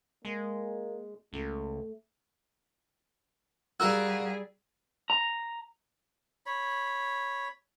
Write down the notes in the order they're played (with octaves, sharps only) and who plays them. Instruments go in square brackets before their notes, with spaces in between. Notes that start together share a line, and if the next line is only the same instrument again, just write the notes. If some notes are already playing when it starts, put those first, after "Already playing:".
[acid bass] G#3 [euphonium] A#3
[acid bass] C#2 [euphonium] A3
[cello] G3 G#4 [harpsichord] F#4 A#4 F5 [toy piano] E6
[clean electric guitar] A#5
[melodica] C#5 B5